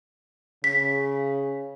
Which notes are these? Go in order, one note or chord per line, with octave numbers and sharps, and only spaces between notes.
C#3 B6